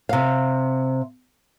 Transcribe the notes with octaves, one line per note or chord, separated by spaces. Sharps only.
C3 F5